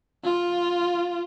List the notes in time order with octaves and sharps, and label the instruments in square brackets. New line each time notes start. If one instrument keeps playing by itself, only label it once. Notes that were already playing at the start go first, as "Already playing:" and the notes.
[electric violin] F4